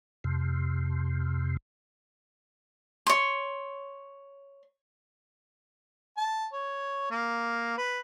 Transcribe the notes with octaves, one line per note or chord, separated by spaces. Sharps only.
F2 C3
C#5 C6
A5
C#5
A#3
B4